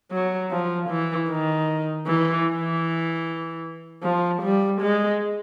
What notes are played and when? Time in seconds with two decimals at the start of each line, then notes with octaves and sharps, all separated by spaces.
0.11 F#3
0.51 F3
0.89 E3
1.29 D#3
2.06 E3
2.47 E3
4.03 F3
4.42 G3
4.81 G#3